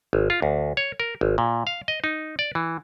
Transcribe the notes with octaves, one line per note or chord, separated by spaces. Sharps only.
G#1
F4
D2
C#5
A#4
G#1
A#2
F5
D#5
D#4
D5
E3